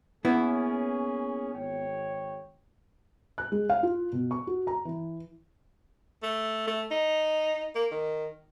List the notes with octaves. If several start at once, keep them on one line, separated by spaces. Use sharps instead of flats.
A#3 B3 C#4 E4 G#4
G#1 C#5 G5
F#6
G#3
F5
F4
B2
C#6
F#4
A#5
E3
A3
A3
D#4
A#3
D#3